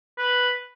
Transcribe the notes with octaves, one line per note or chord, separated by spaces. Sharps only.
B4